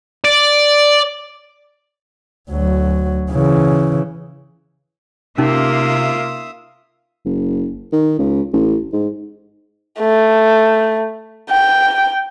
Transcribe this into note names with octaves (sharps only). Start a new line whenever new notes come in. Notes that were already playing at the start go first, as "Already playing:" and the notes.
D5
D2 F#3
C#3 E3
C3 A#3 C#4 D#4 F4 E5 F5 D#6
F#1
D#3
C#2
A1
G#2
A3
G5